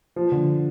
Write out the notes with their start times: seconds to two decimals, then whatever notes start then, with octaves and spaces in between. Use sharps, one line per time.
0.16 F3
0.32 D3